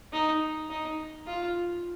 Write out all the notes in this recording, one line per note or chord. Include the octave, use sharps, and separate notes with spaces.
D#4
D#4
F4